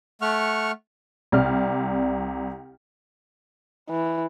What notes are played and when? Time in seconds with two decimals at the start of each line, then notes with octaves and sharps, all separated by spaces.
0.22 A3 F#5 C#6 F6
1.32 C2 C3 D5 F6
3.90 E3